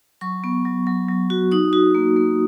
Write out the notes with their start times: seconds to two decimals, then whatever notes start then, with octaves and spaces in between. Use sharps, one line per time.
0.21 F#3 C#6
0.44 B3
0.65 F#3
0.87 F#3
1.09 F#3
1.30 F#4
1.52 D#4 D#6
1.73 F#4
1.95 A#3
2.17 A#3